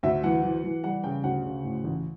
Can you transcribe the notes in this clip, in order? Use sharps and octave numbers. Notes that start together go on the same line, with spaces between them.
D2 E5
E3 F#5
E3
E3
G3 F#5
C#3 G5
D2 F#5
C#3
A2
A1